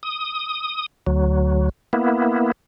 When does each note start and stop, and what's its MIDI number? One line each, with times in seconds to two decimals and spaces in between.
0.03 0.86 87
1.07 1.69 38
1.07 1.69 54
1.93 2.52 58
1.93 2.52 59
1.93 2.52 64